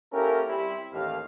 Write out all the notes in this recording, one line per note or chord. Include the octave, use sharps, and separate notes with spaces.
A#3 C#4 E4 G4 A4 A#4
G3 C4 E4
A1 D#2 F5